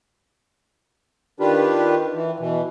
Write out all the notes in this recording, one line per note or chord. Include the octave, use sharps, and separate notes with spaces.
D#3 D4 F4 G4 B4
E3
B2 E3